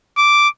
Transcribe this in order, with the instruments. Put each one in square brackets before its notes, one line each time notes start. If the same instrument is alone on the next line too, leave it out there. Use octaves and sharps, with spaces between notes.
[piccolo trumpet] D6